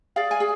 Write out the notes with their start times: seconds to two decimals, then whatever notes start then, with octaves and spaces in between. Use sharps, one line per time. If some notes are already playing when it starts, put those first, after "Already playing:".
0.16 G#4 D5 F5
0.31 G#5
0.40 G#4